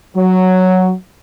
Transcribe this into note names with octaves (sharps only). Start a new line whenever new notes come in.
F#3